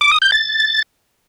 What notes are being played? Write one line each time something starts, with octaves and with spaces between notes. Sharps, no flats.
D6
D#6
G6
A6